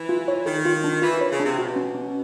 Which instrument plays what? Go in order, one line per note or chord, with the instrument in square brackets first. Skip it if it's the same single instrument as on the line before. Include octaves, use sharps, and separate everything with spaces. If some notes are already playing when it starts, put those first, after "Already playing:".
Already playing: [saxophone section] E3
[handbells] F4
C#5
[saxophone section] D#3 [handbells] A4
[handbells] F4
D4
[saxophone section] E3 [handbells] F4
[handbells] C#5
[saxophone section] C#3
[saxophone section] C3 [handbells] D4
[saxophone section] B2 [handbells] F#4
[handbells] C#4
C#4